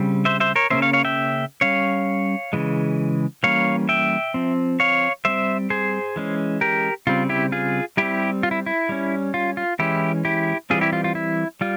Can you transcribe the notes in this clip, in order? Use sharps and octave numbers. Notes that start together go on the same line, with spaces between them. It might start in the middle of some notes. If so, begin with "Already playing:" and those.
Already playing: C#3 G3 C4
C5 E5
C5 E5
A#4 C#5
C#3 F3 A#3 C#4 C5 E5
C#5 F5
C#5 F5
E5 G5
G3 C#4 C#5 F5
C#3 E3 G#3
E3 G3 A#3 C#4 C#5 F5
E5 G5
F3 C4
C#5 F5
G3 C4 C5 E5
G#4 C5
E3 G#3 C#4
G4 A#4
C#3 G3 C4 F4
E4 G4
F4 G#4
G3 C4 E4 G4
F4
E4
E4
G3 C#4
F4
F4
E3 G#3 C#4 E4 G4
E4 G4
E3 G3 C4 F4 G#4
E4 G4
F4
F4
E4
G3 F4